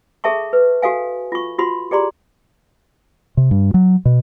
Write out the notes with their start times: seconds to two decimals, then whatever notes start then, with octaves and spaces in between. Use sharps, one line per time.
0.24 G#4 A4 E5 A5 C#6
0.53 B4
0.82 F#4 A4 F5 G#5
1.32 F4 C#6
1.59 F4 F#4 B5 C6
1.91 G4 G#4 D5 A#5 C6
3.37 C3
3.51 G2
3.74 F#3
4.05 B2